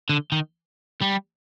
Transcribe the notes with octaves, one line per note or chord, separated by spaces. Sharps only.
D3
D#3
G3